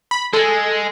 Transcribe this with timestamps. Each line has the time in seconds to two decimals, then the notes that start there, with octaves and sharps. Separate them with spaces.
0.11 B5
0.33 G#3 A4